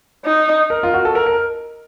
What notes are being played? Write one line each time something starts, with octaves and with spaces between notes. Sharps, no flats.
D#4
A#4
F4
F#4
A4
A#4
A#4